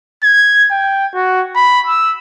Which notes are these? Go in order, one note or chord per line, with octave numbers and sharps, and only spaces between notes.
G#6
G5
F#4
B5
E6